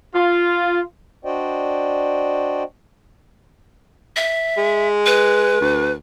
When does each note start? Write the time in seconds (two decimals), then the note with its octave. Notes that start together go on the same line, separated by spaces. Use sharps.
0.15 F4
1.25 D4 F#4 C5 D5 D#5 G5
4.16 E5
4.58 G#3
5.06 B4
5.61 D2